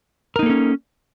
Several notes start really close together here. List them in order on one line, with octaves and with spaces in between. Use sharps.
A#4 D#4 A#3 A4 C#4